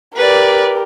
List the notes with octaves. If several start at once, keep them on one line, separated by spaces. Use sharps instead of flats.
G4 A#4 B4 D5